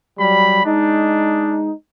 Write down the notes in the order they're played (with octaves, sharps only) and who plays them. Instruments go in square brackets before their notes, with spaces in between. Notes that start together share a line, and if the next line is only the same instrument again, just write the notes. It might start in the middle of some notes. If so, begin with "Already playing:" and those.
[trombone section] F#3 G3 [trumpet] B5
[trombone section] G#3 D#4 [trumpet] D4